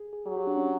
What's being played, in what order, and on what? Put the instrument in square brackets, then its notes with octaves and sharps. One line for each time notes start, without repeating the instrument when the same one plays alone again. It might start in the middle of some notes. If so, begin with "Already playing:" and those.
Already playing: [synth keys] G#4
G#4
[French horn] F#3 [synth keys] G#4
[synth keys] G4
D4
C#4